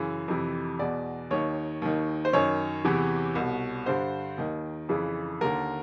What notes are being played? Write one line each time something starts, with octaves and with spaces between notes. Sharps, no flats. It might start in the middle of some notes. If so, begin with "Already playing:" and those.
Already playing: F#2 C#3 E3
F2 C3 E3
E2 B2 D5
D#2 D#3 C#5
D#2 D#3
C5
F#2 D#3 C#5
E2 C3 E3
C2 B2
G2 D3 C5
D#2 D#3
F2 C#3 E3
D#2 D3 A#4